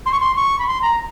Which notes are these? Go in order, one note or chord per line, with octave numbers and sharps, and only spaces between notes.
C6
C#6
C6
C#6
B5
C6
A#5